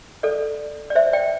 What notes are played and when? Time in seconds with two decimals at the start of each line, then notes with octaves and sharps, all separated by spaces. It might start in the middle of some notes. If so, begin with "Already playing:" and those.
0.23 A4 D5
0.90 D5
0.95 C5 E5
1.13 D5 G5